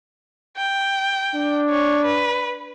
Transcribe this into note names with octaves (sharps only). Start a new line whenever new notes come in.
G5
D4
C#5
B4